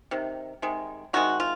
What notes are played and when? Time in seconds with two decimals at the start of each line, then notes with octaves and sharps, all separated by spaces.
0.11 C3 D#3
0.62 C3 D#3 G#3
1.13 C3 D#3 G#3 F#4
1.40 F4